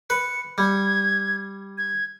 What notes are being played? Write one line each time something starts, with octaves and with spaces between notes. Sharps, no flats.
B4 C#7
G3 G#6
G#6